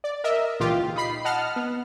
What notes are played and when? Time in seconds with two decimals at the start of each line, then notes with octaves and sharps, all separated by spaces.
0.04 D5
0.24 A#4 D#5 E5
0.60 C#2 A#2 E3 F4 G4
0.96 D#4 B5 C7
1.25 D#5 F#5 A5 F6
1.56 B3